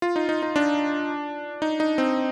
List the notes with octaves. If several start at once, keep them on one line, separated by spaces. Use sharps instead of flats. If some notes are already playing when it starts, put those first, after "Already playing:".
F4
D#4
D#4
D#4
D4
D#4
D#4
C4